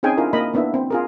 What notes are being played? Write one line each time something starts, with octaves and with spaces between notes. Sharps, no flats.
C4 C#4 D#4 G#4 G5 G#5
D4 E4 F4 A#4
A#3 A#4 D#5 B5
A#3 B3 D4 E4 E5
C4
F4 G#4 A#4